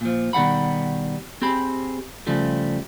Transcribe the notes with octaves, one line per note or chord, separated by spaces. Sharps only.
A#2 F3
B2 D#3 G3 F#5 B5
C4 G4 G#4 B5
C#3 F3 G3 A3